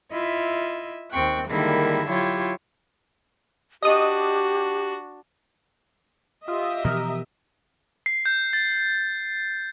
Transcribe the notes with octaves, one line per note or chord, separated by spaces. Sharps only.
E4 F4 D#5 E5
D#2 C4 G5 C#6 F#6
D3 D#3 G3 G#3 A#3 E4
F#3 E4 F4 G4 C#5
D4 F#4 G4 D#5 D#6
F4 G4 D#5 E5
B2 E3 F3 A#4
C7
G6
A6